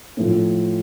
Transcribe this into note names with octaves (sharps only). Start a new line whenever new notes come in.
A2 F3